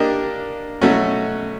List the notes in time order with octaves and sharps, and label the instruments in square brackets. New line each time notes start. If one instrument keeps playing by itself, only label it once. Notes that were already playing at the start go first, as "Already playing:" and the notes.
Already playing: [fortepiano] A#3 D4 G4 A#4 D#5
B2 F#3 A3 C#4 F#4